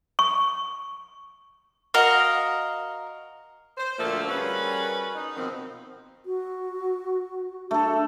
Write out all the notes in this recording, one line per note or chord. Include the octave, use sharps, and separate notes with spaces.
C#6
F#4 A#4 D#5 F5
C5
D2 A#2 F3 A3 A#3 A4
G3 C#4 F#4 G#4 A#4 B4
D#4
B2 D#3 F3 C4
F#4
A3 D4 A4